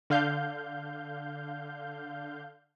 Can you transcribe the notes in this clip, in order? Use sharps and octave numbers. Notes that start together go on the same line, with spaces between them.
D3 F5 G6